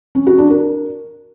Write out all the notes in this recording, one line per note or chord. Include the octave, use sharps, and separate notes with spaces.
C#4
F#4
D4
A#4